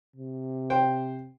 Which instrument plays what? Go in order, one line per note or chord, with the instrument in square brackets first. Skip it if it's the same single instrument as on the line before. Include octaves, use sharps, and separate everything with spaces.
[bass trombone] C3
[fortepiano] C5 G5